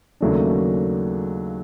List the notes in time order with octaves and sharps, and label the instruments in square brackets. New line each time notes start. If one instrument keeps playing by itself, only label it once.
[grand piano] D#2 C#3 F#3 A3 D4